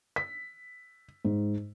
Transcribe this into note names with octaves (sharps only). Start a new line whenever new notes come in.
B6
G#2